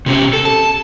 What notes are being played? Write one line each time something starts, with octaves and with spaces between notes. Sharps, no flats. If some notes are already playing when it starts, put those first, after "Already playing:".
C3 C#4 G4
A4
A5